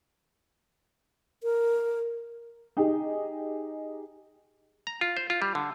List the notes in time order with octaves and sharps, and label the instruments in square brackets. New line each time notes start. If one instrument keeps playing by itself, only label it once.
[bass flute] A#4
[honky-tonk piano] D#4 G4 G#4
[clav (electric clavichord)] A#5
F4
C5
F4
G3
D3